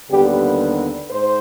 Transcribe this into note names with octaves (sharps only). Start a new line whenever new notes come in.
D#2 D3 G3 B3 G4
G#2 C5